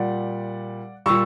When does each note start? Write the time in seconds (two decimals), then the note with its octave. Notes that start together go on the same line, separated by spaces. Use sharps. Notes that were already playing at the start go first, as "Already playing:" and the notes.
Already playing: A#2 G3 D5 F#5
1.06 A#2 G3 C#6 E6